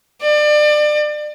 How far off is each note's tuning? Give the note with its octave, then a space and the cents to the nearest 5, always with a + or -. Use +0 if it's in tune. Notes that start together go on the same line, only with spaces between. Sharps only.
D5 +30